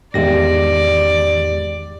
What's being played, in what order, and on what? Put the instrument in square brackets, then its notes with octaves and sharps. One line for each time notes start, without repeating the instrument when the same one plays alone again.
[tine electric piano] E2 G4 A#6 [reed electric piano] G#2 D#3 G#3 [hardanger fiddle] D5